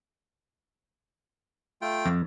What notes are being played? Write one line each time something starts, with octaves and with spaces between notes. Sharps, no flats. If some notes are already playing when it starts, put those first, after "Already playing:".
A3 F4 G5
F2